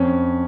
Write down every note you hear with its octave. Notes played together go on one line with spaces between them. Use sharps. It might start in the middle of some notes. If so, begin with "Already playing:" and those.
Already playing: F2 C#4